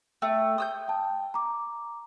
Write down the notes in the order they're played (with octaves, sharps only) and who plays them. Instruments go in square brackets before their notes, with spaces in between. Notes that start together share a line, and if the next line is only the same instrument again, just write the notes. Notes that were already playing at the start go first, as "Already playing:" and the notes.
[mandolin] A3 [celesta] G5
[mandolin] D#6 E6 G6
[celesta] G5 A5
A#5 D6